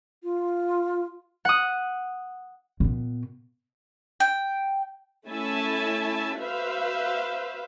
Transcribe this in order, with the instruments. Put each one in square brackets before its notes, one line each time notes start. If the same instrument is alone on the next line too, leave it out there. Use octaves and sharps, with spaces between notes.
[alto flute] F4
[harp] F#5 D#6
[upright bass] A#2 B3
[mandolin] G5
[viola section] A3 C#4 E4 E5 G#5 A5
F#4 B4 C5 E5 F5